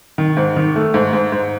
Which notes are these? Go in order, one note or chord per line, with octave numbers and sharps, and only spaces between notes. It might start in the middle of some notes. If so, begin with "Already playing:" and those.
D#3
G#2
D#3
A3
G#2
G#2
G#2